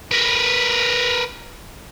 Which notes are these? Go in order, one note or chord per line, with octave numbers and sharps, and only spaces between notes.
A#4 B4